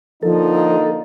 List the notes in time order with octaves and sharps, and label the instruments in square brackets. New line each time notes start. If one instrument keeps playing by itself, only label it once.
[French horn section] D3 A#3 D#4 [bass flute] F3 [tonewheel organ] A4